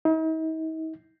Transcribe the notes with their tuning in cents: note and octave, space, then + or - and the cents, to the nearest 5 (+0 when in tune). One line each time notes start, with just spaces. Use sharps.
D#4 +45